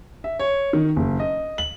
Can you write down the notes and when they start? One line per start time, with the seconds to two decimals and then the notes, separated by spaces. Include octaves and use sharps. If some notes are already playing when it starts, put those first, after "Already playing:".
0.24 E5
0.39 C#5
0.73 D#3
0.96 F#1
1.20 D#5
1.58 F#7